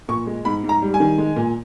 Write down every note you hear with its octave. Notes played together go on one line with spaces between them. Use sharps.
A#2 C#6
G#3
G#2 B5
G#2
A#5
G3
G#5
D#3
G#3
A#2